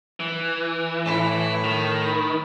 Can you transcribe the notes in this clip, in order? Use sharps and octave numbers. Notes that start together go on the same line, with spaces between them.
E3
A2 E4
D#3